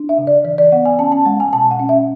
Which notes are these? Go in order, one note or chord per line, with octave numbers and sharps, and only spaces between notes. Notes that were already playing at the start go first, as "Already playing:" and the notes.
Already playing: D4
E5
C#3
D5
E3 D5
D5
B3 F#5
G#5
C#4 A5
A5
G#3 F#5
G#5
B2 A5
F#5
C#4
E5